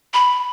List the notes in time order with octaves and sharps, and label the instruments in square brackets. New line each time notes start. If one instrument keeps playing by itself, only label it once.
[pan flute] B5